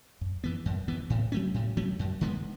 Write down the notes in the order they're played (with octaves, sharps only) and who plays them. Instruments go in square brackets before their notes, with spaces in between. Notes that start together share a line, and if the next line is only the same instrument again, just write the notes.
[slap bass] F#2
E3 B3
F#2
E3 B3
A2
F#3 A3 C#4
A2
F#3 A3 C#4
F#2
D3 G#3 B3